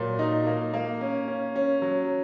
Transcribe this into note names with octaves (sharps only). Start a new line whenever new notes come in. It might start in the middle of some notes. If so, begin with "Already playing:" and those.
Already playing: A#2 F#3
D#4
A#3
A#3
C#4
C#4
C#4
F#3